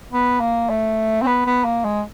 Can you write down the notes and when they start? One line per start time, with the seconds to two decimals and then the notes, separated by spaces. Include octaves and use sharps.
0.12 B3
0.40 A#3
0.69 A3
1.22 C4
1.27 B3
1.46 B3
1.65 A#3
1.84 G#3